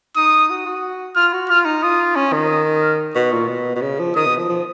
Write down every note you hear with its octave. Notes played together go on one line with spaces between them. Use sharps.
D#4 D#6
F#4
F#4
F4 F6
F#4
F4 F6
D#4
F4 D#6
C#4
D#3
D#6
F6
B2 C#6
A#2
B2
B2
C#3
F3
D#3 D#6
B2
F3
F3